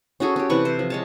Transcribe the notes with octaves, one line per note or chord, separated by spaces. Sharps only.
C#4 F#4 G#4 A4
C#4 G4
C3 E3 B4 C#6
C5
F3
G#3 C#5 A5